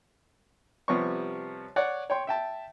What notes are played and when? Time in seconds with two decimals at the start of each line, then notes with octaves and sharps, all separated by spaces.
0.88 C3 F3 G3 B3 C#5 C#6
1.76 C#5 D5 F#5
2.10 C#5 G5 C6
2.27 E5 G5 A5